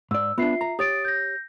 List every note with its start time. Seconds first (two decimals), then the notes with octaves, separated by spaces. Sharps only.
0.11 G#2 D5 E6
0.38 B3 D4 F4 E5 C7
0.61 A#5
0.79 G4 C#5 D#6 A6 D7
1.05 G6 A#6